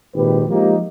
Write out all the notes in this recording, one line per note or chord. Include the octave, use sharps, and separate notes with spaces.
G#1 A#2 D#3 G4 B4
F3 G#3 A#3 D#4 G4